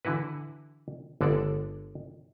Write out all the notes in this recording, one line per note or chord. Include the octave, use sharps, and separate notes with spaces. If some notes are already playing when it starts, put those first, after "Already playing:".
D3 E3 E4 F#4 B4
G1 D3 G#3 A4 D5